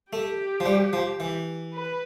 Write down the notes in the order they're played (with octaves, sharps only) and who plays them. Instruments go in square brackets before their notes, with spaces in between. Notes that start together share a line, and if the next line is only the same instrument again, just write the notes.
[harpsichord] A3 [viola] G4
[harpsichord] F3
G3
F3
E3
[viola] B4